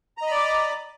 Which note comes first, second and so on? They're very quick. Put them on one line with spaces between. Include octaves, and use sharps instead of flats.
A#5 D#5 B5 D5 D6